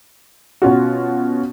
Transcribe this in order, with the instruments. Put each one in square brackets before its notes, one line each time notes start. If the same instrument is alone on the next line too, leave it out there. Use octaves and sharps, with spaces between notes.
[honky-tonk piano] B2 C#4 F4 F#4